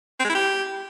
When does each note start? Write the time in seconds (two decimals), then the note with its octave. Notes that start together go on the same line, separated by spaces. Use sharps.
0.19 C4
0.24 G#3
0.30 E4
0.35 G4